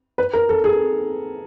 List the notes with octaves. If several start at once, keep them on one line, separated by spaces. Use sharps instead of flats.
B4
A#4
A4
G#4